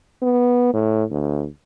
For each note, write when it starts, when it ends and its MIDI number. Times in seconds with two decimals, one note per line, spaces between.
0.22 0.71 59
0.73 1.04 45
1.11 1.47 38